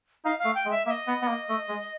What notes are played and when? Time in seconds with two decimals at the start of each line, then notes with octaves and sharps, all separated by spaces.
0.25 D#4 F5
0.40 F5
0.45 A3
0.55 G5
0.66 G#3
0.71 E5
0.86 A#3 E5
0.91 D#5
1.07 B3
1.22 B3
1.28 A#3
1.49 A3
1.69 G#3